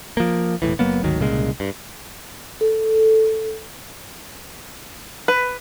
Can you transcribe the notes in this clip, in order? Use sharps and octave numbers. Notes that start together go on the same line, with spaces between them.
F3 A#3
E1 A2 E3
F#1 F#3 A#3 B3
G#1 D2 D#3 F#3
C2 A#2 C#3 G#3
G2
A4
B4